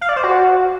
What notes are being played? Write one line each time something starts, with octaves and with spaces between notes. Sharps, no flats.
F5
D5
C5
F#4